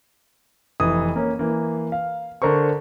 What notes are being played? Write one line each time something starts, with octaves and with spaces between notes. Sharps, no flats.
F1 E3 D#6
A#3 C#4
E3 A#3
F5
D3 A#4 C5 C#6